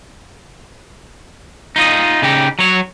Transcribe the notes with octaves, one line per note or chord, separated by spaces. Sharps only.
D#4 F4 D#5
C#3 D#4 G4
F#3 C#5